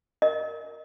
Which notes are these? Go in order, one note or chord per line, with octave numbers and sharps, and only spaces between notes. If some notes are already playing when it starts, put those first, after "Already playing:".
A#4 D#5